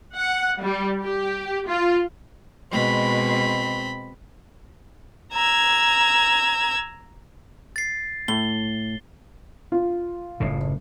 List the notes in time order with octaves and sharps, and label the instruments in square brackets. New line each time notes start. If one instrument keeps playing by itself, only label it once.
[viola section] F#5
G3
G4
F4
[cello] B2 G#3 [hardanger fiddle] C4 B5
[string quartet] A#5 E6 G#6
[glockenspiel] A6 C7
[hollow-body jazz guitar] A2 [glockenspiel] G7
[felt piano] F4
[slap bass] F#1 A2 C#3